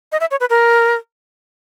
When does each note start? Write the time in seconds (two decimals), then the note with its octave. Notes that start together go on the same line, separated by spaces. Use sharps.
0.12 D#5
0.21 E5
0.31 C#5
0.40 B4
0.50 A#4